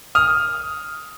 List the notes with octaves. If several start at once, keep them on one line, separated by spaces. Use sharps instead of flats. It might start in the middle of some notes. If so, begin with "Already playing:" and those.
D#6 F6